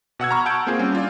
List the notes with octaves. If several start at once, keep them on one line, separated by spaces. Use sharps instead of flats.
B2 F#5 E6 G#6
A#5 B5 C#6 F6
F#5 A5 G6 D7
A#3 C4 F4 G#4
G3 C#4
D4 F4 D5